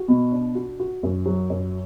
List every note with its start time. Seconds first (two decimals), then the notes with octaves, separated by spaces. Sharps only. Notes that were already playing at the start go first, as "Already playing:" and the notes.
Already playing: F#4
0.08 B2
0.32 D4
0.55 F#4
0.80 F#4
1.03 F#2
1.26 F#3
1.50 F#2